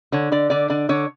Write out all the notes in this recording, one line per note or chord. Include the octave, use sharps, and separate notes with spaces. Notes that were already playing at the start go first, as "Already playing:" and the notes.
D3 C#5
D3 D5
D3 D5
D3 D5
D3 C#5